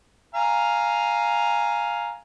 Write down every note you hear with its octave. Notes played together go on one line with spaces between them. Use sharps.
F5 G#5 A#5